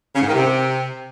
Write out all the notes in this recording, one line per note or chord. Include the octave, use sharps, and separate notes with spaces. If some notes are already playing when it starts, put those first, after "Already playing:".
C#3
G#2
D#3
C3